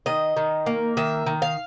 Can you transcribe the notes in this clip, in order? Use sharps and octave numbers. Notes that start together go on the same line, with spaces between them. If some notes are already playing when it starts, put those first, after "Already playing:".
D#3 D#5
D#3
A#3
D#3 E5
D#3
F5